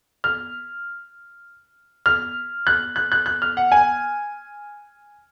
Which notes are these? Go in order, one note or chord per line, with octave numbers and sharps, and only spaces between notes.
F6
F6
F#6
F#6
F#6
F#6
F6
F#5
G#5